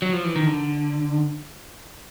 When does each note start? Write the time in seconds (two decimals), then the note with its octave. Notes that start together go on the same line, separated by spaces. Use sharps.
0.02 F#3
0.13 F3
0.24 E3
0.36 D#3
0.47 D3